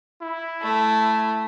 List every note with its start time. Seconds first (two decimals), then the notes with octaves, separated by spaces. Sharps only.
0.22 E4
0.62 A3